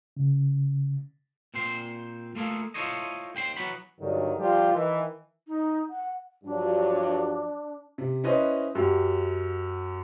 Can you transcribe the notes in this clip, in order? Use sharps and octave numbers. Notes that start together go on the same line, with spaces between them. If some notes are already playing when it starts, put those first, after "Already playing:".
C#3
A#2 C4 C5 C6
A3 A#3 F4 G#4 A4
E4 F4 A4 C5 C#5 D#5
D#2 G5 B5 C6
E3 F#3 B3 F#4 B5
G2 D3 D#3 F#3
F3 G3 F4 G4
D#3 E3
D#4
F#5
G2 F3 F#3 D4
C3
C#4 E4 B4 C5 D#5
F#2 G4